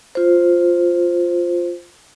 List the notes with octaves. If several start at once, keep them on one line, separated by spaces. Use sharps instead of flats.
F4 C5